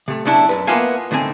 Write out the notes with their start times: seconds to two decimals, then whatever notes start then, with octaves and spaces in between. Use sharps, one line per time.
0.08 C3 A3
0.25 B1 C#3 C#4 D4 E4 A5
0.49 F#2 B4
0.67 A#3 B3 F4 E5 F5 G#5
1.11 A2 D3 D#3 C4 G#5